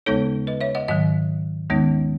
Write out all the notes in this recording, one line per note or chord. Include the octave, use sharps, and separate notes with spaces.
D#2 C#3 G#3 B3 D#4 A4 C#5
B4 D#5
C#5 E5
D#5 F#5
G#2 D#3 F#3 D#5 F#5
D#2 D#3 G#3 B3 D#4